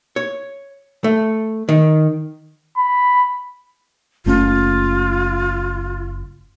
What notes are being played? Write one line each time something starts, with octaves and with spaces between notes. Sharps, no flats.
C#5
A3
D#3
B5
F#1 A3 C#4 F4